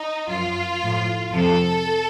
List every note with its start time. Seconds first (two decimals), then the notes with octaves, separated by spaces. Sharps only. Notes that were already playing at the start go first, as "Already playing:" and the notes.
Already playing: D#4
0.29 F#2 F3 F4
0.80 A2 F3
1.32 F2 C3 F3 A4